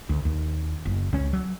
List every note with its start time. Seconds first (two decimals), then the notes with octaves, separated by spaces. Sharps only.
0.09 D2
0.25 D#2
0.85 F#1
1.13 C#2 C#4
1.33 F#3